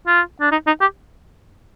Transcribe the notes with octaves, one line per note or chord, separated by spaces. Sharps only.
F4
D4
D#4
D#4
G4